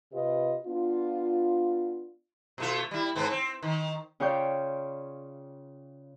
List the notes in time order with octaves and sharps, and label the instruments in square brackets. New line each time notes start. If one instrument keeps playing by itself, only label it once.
[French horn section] C3 F4 G4 B4 D#5
B3 D4 F4
[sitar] B2 A3 F4
G3 E4
G#2 B3 C4
C4
D#3
[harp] C#3 F4 C#5 D5 G5 G6